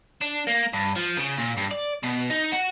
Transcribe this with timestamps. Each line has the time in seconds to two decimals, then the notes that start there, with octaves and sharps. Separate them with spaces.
0.21 D4
0.47 A#3
0.73 G2
0.96 F3
1.17 C#3
1.39 A#2
1.57 G2
1.71 D5
2.03 B2
2.30 D#4
2.52 F#4